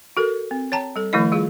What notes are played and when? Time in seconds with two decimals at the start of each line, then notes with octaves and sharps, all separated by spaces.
0.17 F#4 A4 A#4
0.51 C4
0.72 C#5 G5 A5 A#5
0.96 G3 A4
1.13 D#3 F3 A3 E4 D#5
1.32 G3 F4 G#4 F5